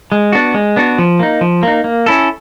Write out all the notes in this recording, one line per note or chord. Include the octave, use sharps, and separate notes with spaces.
G#3
B3 D4 F#4
G#3
B3 D4 F#4
F3
A#3 D#4
F3
A#3 D#4
A#3
C#4 E4 A4